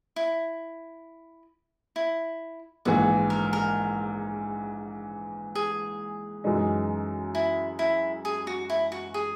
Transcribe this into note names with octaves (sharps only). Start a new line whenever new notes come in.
E4
E4
A#1 G#2 E3 F#4
A#4
A#4
G#4
F#2 E3 G#3 D#4
E4
E4
G#4
F#4
E4
F#4
G#4